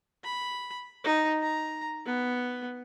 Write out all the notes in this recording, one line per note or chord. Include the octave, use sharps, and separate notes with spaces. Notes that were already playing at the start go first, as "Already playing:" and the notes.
B5
D#4
A#5
B3